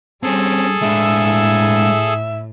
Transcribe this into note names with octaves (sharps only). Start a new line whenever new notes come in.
G3 C4 C#4 G#4 A4
A2 G#3 D4 E5